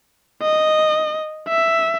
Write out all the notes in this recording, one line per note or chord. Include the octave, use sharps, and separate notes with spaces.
D#5
E5